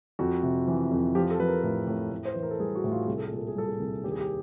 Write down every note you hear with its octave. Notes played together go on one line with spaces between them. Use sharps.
F2 F#4
C3
E3
F2
F3 G4
A4
F3 B4
A#4
A2 A#4
A2
A2
C5
E3 B4
A#4
A4
G3 G#4
F#4
A2
F4
C2 G#4
A4
A#2 G#4
A4
G#4
G3 A4
G#4
C2
D#2 G4
G#4
G4